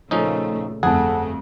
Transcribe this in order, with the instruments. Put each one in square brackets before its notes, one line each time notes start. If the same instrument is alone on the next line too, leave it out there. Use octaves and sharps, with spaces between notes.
[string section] A#2 C#3 A3 [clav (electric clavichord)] F3 C#4 D#4
[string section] G1 A3 [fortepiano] F2 [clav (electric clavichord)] G#4 [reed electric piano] F#5 A5